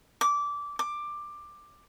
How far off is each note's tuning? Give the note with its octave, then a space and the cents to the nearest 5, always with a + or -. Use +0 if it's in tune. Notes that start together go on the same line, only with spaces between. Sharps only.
D6 -15
D6 +15